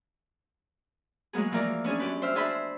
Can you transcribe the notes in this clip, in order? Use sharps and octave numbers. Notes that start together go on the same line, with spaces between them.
F#3 G#3 A#3 B3 G#4
E3 F3 A#3 A#4 D5
B3 C#4 D4 G#4
F#2 G4 B4
C5 E5 F6
D4 G#4 B4 C5 E5 B5